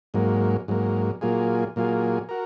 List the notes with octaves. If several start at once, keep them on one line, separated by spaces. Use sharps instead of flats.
G#2 F#3 A#3
G#2 F#3 A#3
A#2 F#3 A#3 F4 G#4
A#2 F#3 A#3 F4 G#4
F#4 A#4